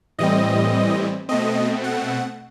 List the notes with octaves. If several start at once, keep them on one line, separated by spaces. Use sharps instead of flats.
A2 E3 G3 C4 D#5
B2 A3 C4 D#5
F#5